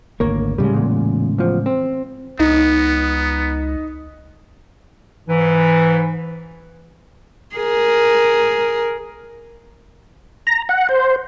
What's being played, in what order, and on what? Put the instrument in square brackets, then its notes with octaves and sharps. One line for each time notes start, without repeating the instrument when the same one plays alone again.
[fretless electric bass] G#1 D2 A#3 [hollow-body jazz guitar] A#4 C#5
[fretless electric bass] A2 C#3 G#3 [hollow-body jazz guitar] G3
[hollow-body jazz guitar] E2 A#2
E2 F3
C4
[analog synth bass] C#2 [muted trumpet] B3 [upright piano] D#4
[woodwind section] G#2 E3
[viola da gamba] G#4 A#4
[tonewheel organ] A#5
F#5
C5